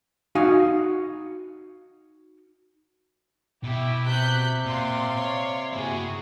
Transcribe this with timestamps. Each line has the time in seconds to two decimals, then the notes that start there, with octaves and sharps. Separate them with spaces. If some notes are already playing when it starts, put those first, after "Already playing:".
0.35 D#4 F#4 F5 G#5
3.64 B2 E4 G4
4.05 C3 F#6 G6 B6
4.66 A#2 D5 F5 C6
5.17 C#5
5.73 A#3 E4 F#4 G#4